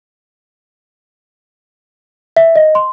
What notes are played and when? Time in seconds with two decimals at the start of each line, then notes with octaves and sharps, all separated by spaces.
2.37 E5
2.56 D#5
2.75 C6